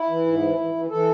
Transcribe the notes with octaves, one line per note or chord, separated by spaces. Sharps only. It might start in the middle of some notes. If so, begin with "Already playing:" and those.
Already playing: E4
E3
G#2
E3
E3
E3
E3 A4